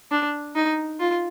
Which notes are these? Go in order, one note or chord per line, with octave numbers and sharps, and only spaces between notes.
D4
D#4
F4